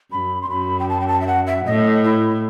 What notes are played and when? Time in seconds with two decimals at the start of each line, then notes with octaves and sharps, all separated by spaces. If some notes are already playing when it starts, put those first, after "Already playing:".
0.11 F#2 B5
0.42 C6
0.50 F#2 B5
0.79 G5
0.89 A5
1.00 G5
1.08 A5
1.21 E5
1.27 F#5
1.47 E5
1.66 A2 D#5
2.04 E4